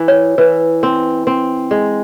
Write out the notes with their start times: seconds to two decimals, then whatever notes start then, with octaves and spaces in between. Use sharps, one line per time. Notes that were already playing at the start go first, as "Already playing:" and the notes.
Already playing: E3
0.08 C#5
0.38 E3 B4
0.83 C4
1.27 C4
1.71 G#3